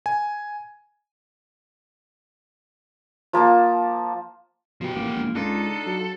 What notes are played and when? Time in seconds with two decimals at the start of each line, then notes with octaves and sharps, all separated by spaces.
0.06 G#5
3.33 F3 A#3 A5 D6
4.81 B2 F3 G4
4.96 A1 A#3
5.15 E1
5.36 C#2 D4 D#4 F4 A4
5.86 F#3